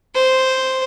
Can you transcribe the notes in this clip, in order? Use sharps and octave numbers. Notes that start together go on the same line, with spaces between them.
C5